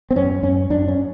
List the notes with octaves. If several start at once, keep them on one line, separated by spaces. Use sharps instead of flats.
C4
F#2 C#4
F#2 C#4
F#2 D4
C#4